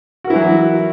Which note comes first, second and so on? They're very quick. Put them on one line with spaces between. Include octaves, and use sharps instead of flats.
F#4 A#4 E4 E3 F#3